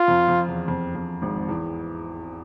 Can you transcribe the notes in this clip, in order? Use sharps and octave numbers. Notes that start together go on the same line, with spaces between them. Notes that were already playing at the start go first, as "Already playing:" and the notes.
Already playing: F4
F2
F2
E2
F2
F2
G#1 G#2
E2 E3